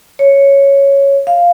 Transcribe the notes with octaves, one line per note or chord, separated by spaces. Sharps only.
C#5
F5